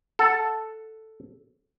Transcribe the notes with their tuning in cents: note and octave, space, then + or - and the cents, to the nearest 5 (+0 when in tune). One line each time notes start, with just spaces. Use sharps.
A4 +0 F#5 +0